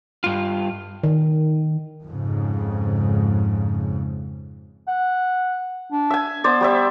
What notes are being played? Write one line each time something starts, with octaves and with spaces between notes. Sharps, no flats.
G2 F4
D#3
F2 G#2 C#3
F#5
D4
E5 G#5
B3 C5 D5
G3 C5 E5